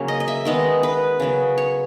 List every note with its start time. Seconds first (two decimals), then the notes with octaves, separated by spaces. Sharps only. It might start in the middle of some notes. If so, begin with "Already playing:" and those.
Already playing: C#3 F#3 A#3 C#4 C#5
0.08 D#5
0.20 D#5
0.28 E5
0.45 D#3 G#3 B3 D#5
0.83 B4
1.20 C#3 F#3 B3
1.58 C#5